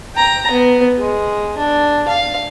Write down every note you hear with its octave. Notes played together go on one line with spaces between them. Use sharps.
G5 A#5
B3
G#3
D4
F5